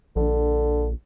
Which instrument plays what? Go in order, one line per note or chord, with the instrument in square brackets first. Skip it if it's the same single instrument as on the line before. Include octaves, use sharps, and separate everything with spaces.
[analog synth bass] A#1 [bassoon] D3